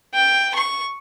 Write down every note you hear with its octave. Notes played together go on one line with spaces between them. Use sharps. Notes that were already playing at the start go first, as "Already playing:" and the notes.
G5
C#6